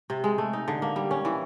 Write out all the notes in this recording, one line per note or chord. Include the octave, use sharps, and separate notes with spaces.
C3
G#3
A3
D#4
D3
A#3
G3
C#4
E3